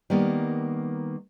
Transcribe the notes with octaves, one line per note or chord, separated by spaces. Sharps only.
D#3 G3 A#3 B3